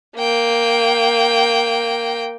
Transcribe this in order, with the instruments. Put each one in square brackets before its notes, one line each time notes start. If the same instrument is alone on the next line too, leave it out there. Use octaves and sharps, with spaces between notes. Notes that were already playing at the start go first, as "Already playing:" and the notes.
[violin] A#3 G5